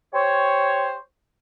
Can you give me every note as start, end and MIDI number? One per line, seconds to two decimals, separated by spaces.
0.14 0.94 67
0.14 0.94 72
0.14 0.94 73